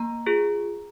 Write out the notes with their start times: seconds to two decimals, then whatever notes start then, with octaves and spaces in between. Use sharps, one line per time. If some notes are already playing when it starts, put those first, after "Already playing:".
Already playing: A#3 A#5
0.26 F4 G#4